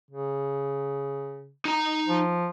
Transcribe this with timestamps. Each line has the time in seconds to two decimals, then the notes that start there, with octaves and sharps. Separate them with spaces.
0.11 C#3
1.65 D#4 A#5
2.07 F3